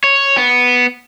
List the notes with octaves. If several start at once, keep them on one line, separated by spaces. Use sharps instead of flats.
C#5
B3